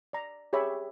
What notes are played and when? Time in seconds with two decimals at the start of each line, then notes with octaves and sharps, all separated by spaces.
0.13 D5 A#5
0.53 G4 G#4 C#5 E5 B5 D6